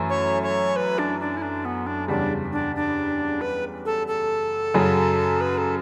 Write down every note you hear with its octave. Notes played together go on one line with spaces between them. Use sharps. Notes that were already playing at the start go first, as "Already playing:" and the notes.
Already playing: F#2 E3 A3 E4 A4
C#5
C#5
B4
D4
D4
E4
D4
B3
D4
E2 C#3 G3 D4
D4
D4
B4
A4
A4
F#2 C#3 F#3
B4
A4